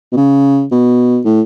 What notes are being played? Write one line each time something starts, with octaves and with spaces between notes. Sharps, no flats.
B2
C#3
B2
A2